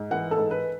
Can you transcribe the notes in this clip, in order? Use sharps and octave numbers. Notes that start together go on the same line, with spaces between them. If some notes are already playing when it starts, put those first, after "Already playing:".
Already playing: G#2
E3 F#5
A4
G#2
B4